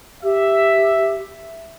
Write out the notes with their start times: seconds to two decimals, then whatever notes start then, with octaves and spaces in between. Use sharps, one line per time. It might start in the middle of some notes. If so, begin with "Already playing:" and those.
0.22 G4 E5